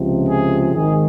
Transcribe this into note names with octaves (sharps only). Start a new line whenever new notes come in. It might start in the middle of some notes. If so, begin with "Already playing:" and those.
Already playing: C#2 C3 F3
G#4
G#1 G#2 D#3 G#4